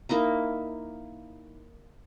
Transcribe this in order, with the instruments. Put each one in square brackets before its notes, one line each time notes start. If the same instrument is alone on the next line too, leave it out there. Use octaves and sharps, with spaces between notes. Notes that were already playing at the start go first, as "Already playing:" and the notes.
[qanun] A#3 D#4 E4 A#5